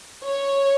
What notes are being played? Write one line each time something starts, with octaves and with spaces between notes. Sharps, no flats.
C#5